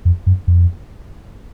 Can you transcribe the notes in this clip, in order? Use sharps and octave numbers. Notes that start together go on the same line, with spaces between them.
F2
F#2
F2